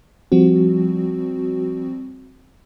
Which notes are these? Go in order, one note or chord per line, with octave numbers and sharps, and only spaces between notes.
F3 G3 C4 F#4